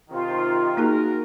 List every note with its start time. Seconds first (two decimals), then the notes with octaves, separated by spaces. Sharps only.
0.11 C3 D#3 F4
0.77 A#3 D#4 F#4 G#4 A#4